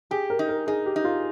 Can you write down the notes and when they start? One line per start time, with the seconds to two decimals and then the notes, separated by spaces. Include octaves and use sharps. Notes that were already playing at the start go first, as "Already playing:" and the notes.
0.11 G4 G#4
0.30 A#4
0.39 D#4
0.49 A#4
0.67 D#4 G#4
0.86 G4
0.96 D#4
1.04 F4